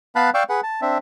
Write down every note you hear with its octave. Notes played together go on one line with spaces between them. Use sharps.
B3 B4 F5 A5 B5 F#6
D5 F5 G5 C#6 D6 E6
G#4 B4 F#5
A5
C4 D4 E5